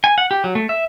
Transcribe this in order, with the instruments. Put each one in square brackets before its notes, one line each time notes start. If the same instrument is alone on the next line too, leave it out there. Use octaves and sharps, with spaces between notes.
[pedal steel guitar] G#5
F#5
G4
F#3
A3
E5